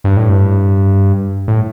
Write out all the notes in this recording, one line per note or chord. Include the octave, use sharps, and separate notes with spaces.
G2
A2
G2
A2